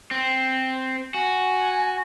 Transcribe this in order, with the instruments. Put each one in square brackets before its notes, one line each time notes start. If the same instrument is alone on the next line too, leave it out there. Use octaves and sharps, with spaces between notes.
[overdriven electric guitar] C4
[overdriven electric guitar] F#4 [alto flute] G#5